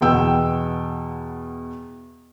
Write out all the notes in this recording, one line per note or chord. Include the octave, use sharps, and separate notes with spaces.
E2 B2 G5 E6